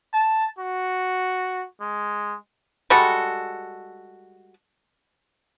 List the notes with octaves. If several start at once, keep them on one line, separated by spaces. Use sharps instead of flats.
A5
F#4
G#3
G3 G#3 F#4 A4